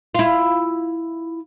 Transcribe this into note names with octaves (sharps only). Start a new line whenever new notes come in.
E4 F4